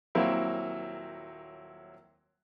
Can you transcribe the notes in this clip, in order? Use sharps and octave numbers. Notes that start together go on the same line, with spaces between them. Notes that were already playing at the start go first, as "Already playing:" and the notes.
D#1 F#3 A#3 C4 E4